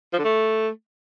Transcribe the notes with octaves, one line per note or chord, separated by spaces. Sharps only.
F3
D3
A3